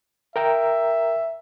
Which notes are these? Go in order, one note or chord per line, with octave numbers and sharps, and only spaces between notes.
A#4 E5 G5 A#5